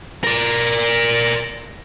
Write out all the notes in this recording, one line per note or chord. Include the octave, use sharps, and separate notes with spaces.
A#4 D5